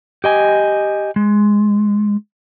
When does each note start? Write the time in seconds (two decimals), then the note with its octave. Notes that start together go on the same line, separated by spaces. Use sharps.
0.24 G4 D#5 G#5
1.16 G#3